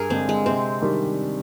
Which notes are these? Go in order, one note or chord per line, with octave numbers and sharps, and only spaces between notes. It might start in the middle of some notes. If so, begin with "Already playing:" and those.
Already playing: G2 G#4 A#4
D3 G#3 C4 D4
G#3
C3 C4
D#3 G3 D4